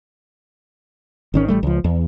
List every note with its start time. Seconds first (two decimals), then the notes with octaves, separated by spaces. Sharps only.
1.34 G#1 D#3 C#4
1.48 A1 G3 A3
1.63 C#2 F3
1.84 E2